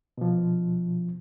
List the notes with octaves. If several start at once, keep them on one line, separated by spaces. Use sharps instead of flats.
B2 F3